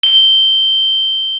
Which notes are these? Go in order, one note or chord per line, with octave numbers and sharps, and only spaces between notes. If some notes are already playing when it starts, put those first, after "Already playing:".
G7